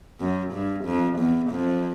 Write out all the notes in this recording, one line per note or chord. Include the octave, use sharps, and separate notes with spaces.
F#2
G2
F2
E2
F2